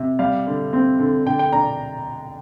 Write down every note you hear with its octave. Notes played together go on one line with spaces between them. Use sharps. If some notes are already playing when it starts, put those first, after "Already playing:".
Already playing: C3
G3 F5
D3
C4
D3
D3 G5
G5
D4 A#5